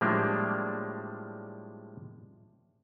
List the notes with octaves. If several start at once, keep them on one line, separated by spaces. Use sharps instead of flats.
A2 F3 G3 G#3 A#3 D4